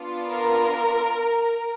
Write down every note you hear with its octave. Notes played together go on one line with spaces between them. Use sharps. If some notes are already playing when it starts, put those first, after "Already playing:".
Already playing: B3 D4 F4
A#4